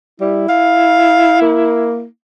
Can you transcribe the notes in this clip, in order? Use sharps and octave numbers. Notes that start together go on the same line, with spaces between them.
G3 E4
F5
A#3